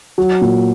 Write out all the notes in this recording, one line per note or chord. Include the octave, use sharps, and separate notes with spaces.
F#3
A#2